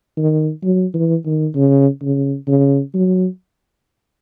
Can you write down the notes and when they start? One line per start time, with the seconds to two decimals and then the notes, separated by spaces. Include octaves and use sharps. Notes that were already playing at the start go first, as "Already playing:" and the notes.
0.17 D#3
0.64 F#3
0.94 E3
1.25 D#3
1.55 C#3
2.02 C#3
2.48 C#3
2.94 F#3